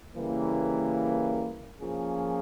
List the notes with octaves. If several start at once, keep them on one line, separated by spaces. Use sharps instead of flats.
C#3 E3 G3 A#3
F3 A#3 C#4 F4 G#4